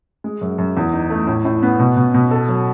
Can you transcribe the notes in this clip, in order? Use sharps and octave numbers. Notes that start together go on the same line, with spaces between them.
G#3
F#2
F#2
E2
D#4
A3
A2
A2
B3
B2
B2
B2
A4
F#3